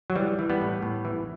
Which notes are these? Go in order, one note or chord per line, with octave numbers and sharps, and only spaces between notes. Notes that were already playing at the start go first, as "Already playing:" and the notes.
F#3
E3 G3
E3
G3 B3
A2
A2
E3